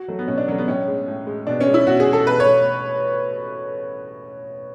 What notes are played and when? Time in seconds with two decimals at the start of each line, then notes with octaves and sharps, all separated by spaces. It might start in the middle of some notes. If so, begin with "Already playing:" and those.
Already playing: F#4
0.08 F#3 A3
0.19 B3
0.28 B2 C#4
0.38 D4
0.48 F#3 C#4
0.52 A3
0.58 B3
0.68 A2 C#4
0.88 G#3
1.08 A2
1.27 G#3
1.47 B2 D4
1.61 C#4
1.67 G#3
1.74 E4
1.87 B2 F#4
2.00 G#4
2.07 G#3
2.13 A4
2.27 B2 B4
2.40 C#5
2.47 A3